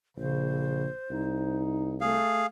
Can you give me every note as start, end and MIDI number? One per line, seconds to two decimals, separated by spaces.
0.17 0.87 34
0.17 0.88 49
0.17 1.58 72
1.11 2.18 36
1.11 2.00 63
2.01 2.43 57
2.01 2.46 68
2.01 2.46 77